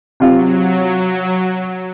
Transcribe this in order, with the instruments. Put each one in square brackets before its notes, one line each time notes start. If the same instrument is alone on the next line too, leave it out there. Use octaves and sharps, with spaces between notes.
[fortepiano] C3 F4 [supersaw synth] F#3